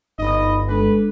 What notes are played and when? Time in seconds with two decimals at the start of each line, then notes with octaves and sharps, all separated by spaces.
0.19 G1 D#4 D#5 B5
0.68 G#3 D4 A4 B4